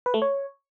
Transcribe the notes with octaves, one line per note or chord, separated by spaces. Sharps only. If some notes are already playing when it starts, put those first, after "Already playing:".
B4
A3
C#5